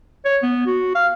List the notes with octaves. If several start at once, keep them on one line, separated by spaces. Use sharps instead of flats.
C#5
B3
F#4
F5